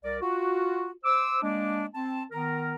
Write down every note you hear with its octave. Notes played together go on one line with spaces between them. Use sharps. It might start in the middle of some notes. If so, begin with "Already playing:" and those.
C2 A#4 D5
F4 F#4
C5 D6 E6
G#3 A#3 D4
C4 A5
D#3 B3 A#4